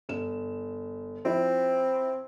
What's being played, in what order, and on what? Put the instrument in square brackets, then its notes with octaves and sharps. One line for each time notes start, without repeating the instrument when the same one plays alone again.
[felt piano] G1 E7
[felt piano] F3 E4 [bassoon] C4